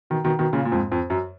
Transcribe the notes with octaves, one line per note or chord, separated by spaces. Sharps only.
B2 D#3
B2 D#3
B2 D#3
A#2 C#3
A#2
F2 G#2
F2
F#2